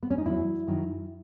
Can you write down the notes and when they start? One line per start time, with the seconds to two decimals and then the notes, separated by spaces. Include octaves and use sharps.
0.03 B3
0.10 C#4
0.18 D#4
0.25 E2 D#3 F#3 E4
0.67 F#2 D#3 F#3